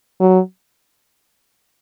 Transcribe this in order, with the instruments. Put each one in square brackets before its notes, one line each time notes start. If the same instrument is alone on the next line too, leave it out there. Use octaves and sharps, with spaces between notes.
[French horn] F#3